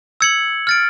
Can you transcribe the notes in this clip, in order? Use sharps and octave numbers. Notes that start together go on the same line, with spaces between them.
E6 G#6 C#7 F#7
F6 A6 D7